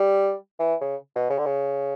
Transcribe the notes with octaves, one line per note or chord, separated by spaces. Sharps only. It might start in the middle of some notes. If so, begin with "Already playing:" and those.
Already playing: G3
E3
C#3
B2
C#3
D3
C#3